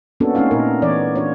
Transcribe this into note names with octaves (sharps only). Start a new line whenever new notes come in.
A#3 B3 C#4 D4 F#4 A4
A3 C4 C#4 D#4 F4 F5
A#2 D#4 A#4
E3 B3 C#5 D5
D4 F4 C#5